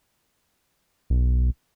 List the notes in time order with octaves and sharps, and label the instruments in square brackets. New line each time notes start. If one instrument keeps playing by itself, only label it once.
[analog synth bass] B1